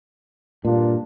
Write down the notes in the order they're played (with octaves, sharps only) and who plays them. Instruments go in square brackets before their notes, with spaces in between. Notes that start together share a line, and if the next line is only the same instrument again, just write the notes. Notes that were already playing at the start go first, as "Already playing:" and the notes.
[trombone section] G2 D4 F4 [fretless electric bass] A#2